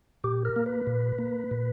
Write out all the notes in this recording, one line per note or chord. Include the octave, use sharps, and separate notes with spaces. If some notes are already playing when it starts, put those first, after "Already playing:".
A#2 G4
A#4
A#3
B4
A#2
A#3
A#2